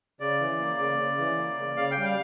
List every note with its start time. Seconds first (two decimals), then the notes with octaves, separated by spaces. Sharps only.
0.20 C#3 D5
0.40 E3
0.59 A#3
0.79 C#3
0.98 C#3
1.18 E3
1.38 A#3
1.57 C#3
1.77 C#3 F5
1.91 G5
1.97 G3
2.04 F5